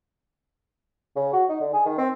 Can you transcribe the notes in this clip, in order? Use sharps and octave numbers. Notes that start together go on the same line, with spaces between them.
C#3
F#4
D#4
D3
G#4
D#3
C4